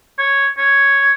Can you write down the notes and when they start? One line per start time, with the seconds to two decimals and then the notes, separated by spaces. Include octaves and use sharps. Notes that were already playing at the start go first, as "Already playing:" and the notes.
0.19 C#5
0.58 C#5